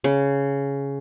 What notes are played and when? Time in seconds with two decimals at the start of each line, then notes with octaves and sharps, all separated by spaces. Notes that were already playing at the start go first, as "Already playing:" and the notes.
0.04 C#3